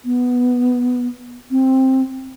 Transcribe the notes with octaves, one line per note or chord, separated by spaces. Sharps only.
B3
C4